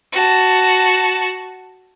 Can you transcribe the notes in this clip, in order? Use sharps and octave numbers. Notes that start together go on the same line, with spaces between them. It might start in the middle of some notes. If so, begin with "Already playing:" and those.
F#4 A5